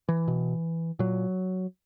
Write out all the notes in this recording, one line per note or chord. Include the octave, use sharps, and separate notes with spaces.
E3
B2
A#2 F#3